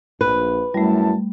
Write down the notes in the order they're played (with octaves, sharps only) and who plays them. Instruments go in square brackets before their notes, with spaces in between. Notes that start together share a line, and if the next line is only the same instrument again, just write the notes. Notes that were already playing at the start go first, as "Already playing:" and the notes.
[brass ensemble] A#1 [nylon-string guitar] B4
[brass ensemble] F#2 E4 A5 [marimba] G3 A3